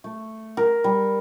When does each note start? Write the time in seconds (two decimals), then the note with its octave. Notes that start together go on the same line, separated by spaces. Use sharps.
0.04 A3
0.57 A#4
0.84 G3